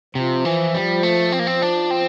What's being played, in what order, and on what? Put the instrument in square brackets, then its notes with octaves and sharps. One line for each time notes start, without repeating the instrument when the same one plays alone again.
[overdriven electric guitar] C3 [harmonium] F3
[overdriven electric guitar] E3
G3
A3
C4
A#3
C4
D4
C4